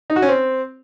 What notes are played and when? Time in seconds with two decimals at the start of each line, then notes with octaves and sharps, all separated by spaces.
0.10 D#4
0.16 F#4
0.22 C#4
0.29 C4